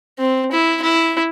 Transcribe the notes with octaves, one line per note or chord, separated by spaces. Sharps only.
C4
E4
E4